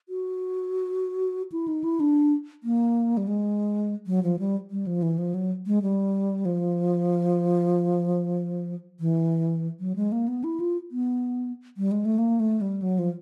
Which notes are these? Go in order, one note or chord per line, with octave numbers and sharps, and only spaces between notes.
F#4
E4
D#4
E4
D4
A#3
G3
G#3
F#3
F3
G3
G3
F3
E3
F3
F#3
G#3
G3
F3
E3
F#3
G#3
A#3
B3
E4
F4
B3
G3
G#3
A3
A#3
A3
G3
F#3
F3